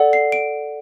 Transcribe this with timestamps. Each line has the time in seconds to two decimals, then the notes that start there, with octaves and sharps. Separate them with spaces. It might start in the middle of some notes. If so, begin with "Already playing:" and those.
Already playing: A4 D5 F#5
0.13 C7
0.32 D7